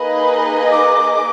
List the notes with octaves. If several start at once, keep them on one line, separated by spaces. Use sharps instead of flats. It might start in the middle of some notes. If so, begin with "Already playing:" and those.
Already playing: A#3 D#4 G#4 B4 D#5 B5
D6